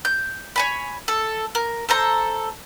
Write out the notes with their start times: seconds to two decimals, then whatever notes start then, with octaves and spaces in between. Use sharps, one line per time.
0.05 G6
0.56 C#5 G#5 B5
1.08 A4
1.55 A#4
1.89 A4 C5 A#5